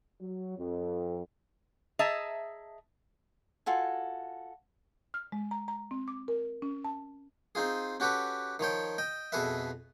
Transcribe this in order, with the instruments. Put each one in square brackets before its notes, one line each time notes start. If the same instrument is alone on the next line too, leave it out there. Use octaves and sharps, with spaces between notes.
[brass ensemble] F#3
F2
[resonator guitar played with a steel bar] G#4 D#5 E5 A5 A#5
[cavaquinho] F4 F#4 A4 G#5
[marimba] F6
G#3
A#5
A#5
C4
D6
A#4
C#4
A5
[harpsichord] C4 D#4 F4 G#4
C#4 F#4 G4 A4 B4
D#3 F3 C#5 G5
D#5 G5
F2 B2 G#4 A4 B4 E5